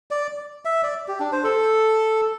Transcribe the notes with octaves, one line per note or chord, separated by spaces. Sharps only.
D5
E5
D5
G4
D4
C5
A4